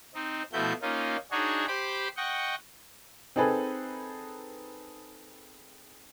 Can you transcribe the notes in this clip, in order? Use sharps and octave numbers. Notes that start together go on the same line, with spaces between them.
C4 D#4
B2 F3 A3 E4 F#4 G6
A#3 C#4 D#4 F4
D4 D#4 F#4 G#4 C#5
G4 C5 B5 D6
D#5 F#5 G5 C#6
C4 D#4 G#4 A4 B4